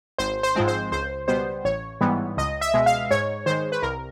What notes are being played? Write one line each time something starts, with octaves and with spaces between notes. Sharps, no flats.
G#1 C5
C5
G#2 F3 G#3 C4
C5
C#2 C5
B2 G3 B3 C5
A1 C#5
G#2 E3 G3 B3
C#2 D#5
E5
B2 G#3
F5
G#2 C#5
D#3 G#3 C5
B4
C2 A#4